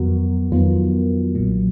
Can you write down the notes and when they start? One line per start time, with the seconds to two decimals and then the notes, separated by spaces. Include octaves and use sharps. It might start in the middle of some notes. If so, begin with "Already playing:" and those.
Already playing: F2 D#3 F#3 B3 F#4 A#4
0.52 F2 D#3 F#3 B3 F4
1.35 B1 A#2 F#3